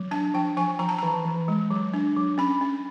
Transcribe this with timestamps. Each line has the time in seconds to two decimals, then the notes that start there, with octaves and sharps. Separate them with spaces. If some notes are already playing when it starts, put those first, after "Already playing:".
Already playing: F#3
0.11 D4 A5
0.34 F3 G5
0.57 F3 G#5
0.79 F3 A#5
0.89 A5
0.98 E3 A#5
1.25 E3
1.48 G#3
1.70 F#3
1.94 D4
2.16 F#3
2.38 C#4 B5
2.61 C#4